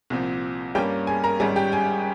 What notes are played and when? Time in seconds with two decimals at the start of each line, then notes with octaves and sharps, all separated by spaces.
0.10 C2 A#2 F3 C4
0.75 G2 G3 A#3 C#4 G4 G5
1.07 G#4 G#5
1.24 A#4 A#5
1.40 G#1 G#2 G3 C#4 G#4 G#5
1.56 G4 G5
1.72 G#4 G#5